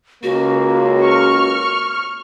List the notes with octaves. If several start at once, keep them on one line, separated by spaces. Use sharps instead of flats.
C#2 A#3 F#4
C#6 F6